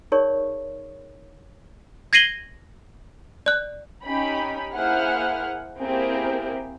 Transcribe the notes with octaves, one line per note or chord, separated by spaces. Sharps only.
D#4 G#4 A#4 C#5 D5 C#6
G#6 A#6 C7 D#7 F#7 G7
D5 F#6
C#4 D#4 G4 B5
A#3 E4 G#4 C5 F#5 F6
A#3 C4 E4 G4 G#4 A#4